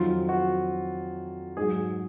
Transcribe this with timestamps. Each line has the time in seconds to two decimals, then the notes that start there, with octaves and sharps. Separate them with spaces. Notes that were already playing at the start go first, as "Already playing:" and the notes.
Already playing: F2 D#3 F#3 F4
0.29 F#4
1.57 G#2 F#3 G#4